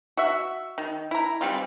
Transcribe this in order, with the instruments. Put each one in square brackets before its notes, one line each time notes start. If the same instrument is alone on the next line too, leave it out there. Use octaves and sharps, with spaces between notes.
[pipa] F#4 E5
D#3
E4 A#5
E3 G3 C4 F4